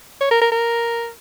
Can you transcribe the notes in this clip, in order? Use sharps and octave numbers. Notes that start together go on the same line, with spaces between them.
C#5
A#4
A#4
A#4